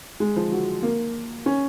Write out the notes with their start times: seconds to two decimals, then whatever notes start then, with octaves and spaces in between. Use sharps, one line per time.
0.20 G#3
0.36 F3
0.51 F#3
0.83 A#3
1.46 C#4